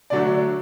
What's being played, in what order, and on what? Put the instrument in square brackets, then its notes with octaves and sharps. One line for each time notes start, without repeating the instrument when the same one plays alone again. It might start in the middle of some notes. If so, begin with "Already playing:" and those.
[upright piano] D3 F#3 A3 D5